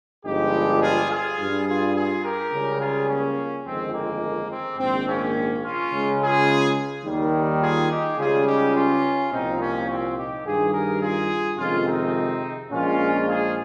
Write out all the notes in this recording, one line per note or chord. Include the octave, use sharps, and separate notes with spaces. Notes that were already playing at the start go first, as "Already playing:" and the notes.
G1 G2 F3 G#3 D#4 G4
F4 G#4
F4 G#4
G2 G3
F4 G#4
F4 G#4
G4 A#4
C#2 C#3 G3
F4 G#4
A#3 C#4
G1 F2 D#3 G#3 C4
A#3
C4
A#1 G#2 D#3 C4
A#3 C#4
C#4 F4
C#2 C#3 G#3
F4 G#4
D#2 D#3 G3
F4 G#4
D#4 G4
C#2 C#3 G3 F4 G#4
D#4 G4
C#4 F4
C2 A#2 F3 C4 D#4
A#3 C#4
C4
D#4 G4
G2 D#3 G3 F4 G#4
G4 A#4
F4 G#4
F2 C3 D#3 G#3 C#4 F4
C4 D#4
A#1 A#2 F3 G#3 C#4 F4
F4 G#4